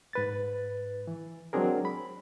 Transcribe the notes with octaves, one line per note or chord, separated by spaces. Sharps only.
G#2 B4 A6
E3
F#3 G#3 C4 D4 G#4 A#4
B5